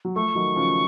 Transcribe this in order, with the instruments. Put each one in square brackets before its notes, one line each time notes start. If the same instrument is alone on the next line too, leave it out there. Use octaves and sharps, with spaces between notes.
[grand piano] F#3
[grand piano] F3 A3 [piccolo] C#6
[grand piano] D#3 F#3
C#3 F3